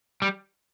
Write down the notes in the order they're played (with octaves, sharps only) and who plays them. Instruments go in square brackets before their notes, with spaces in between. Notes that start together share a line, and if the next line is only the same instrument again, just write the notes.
[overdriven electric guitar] G3